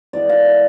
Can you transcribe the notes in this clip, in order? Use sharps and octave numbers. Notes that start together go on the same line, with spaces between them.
E3 G#3 B3 D5
F5
E5